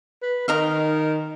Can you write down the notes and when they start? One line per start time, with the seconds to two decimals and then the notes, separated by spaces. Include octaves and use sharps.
0.22 B4
0.48 D#3 A#4 D#5 F5